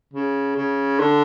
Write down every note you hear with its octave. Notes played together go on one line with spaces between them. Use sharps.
C#3
C#3
D3